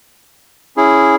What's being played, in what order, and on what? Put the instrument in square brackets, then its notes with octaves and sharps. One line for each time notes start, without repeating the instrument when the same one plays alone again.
[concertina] C#4 E4 G#4